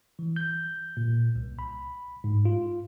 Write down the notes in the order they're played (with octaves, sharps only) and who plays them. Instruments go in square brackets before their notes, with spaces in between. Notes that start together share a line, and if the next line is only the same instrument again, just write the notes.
[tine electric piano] E3
G6
A#2
C2
B5
G#2
F4